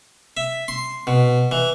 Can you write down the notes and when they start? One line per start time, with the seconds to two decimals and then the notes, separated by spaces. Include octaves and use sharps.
0.37 E5
0.68 C6
1.07 B2
1.51 E3